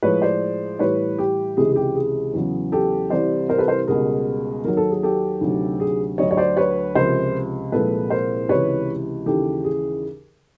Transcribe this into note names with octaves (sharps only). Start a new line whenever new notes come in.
A2 F3 G#3 B4 C#5
C5 D5
A2 E3 G3 B4 C#5
G4
C#2 C3 E3 G#3 G#4
G#4
G4
G#4
E2 C#3 F#3
G4 A4
C2 C3 E3 G3 C5 D5
A#4 C5
A4 B4
A#4 C5
C#2 B2 G3 G#4 A#4
D#2 D#3 F#3 A#4
A4
G#4
G4 A4
D2 C3 D#3 F#3
G#4
D2 D3 F#3 C#5 D#5
C#5
C5 D5
B4 C#5
C#2 C3 F3 A#4 C5
C2 A#2 F3 G#3 A4 B4
A#4 C5
C#2 C3 E3 B4 C#5
D#2 C#3 E3 G4 A4
G#4